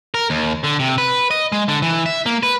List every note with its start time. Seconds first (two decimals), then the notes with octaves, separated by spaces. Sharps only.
0.14 A#4
0.30 D#2
0.64 D3
0.79 C3
0.98 B4
1.31 D#5
1.52 G#3
1.68 D3
1.82 E3
2.06 E5
2.26 A#3
2.43 B4